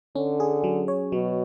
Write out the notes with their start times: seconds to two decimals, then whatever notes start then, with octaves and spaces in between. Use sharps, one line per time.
0.16 D3 C#4
0.40 G#4
0.64 F#3
0.88 C#5
1.12 B2 F#3